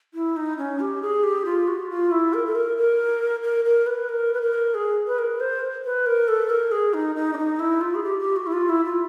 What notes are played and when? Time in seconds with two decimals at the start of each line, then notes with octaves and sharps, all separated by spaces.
0.14 E4
0.37 D#4
0.58 C#4
0.80 G4
1.02 G#4
1.23 G4
1.45 F4
1.68 F#4
1.90 F4
2.11 E4
2.34 A#4
2.46 A4
2.55 A#4
2.77 A#4
3.43 A#4
3.65 A#4
3.87 B4
4.09 A#4
4.33 B4
4.42 A#4
4.74 G#4
5.07 B4
5.19 A#4
5.40 C5
5.85 B4
6.06 A#4
6.28 A4
6.50 A#4
6.72 G#4
6.94 D#4
7.16 D#4
7.33 D4
7.38 D#4
7.59 E4
7.81 F4
7.95 G#4
8.04 G4
8.20 G4
8.36 F#4
8.47 E4
8.53 F4
8.69 E4
8.85 F4